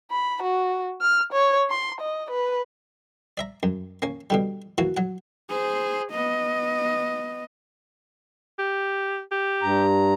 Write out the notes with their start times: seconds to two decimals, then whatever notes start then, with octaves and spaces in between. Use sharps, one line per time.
0.12 B5
0.43 F#4
1.01 F6
1.33 C#5
1.70 C6
2.01 D#5
2.31 B4
3.38 D5 E5 A#5
3.63 F#2
4.02 A#3 C#4
4.30 B2 D3 G3
4.78 E3 A#3 F#4
4.97 F#3 F#5
5.50 G#4 C5
6.12 B3 D#5
8.58 G4
9.31 G4
9.62 G2 A#5